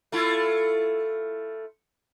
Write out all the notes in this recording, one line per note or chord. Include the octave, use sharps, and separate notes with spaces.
A3 E4 F4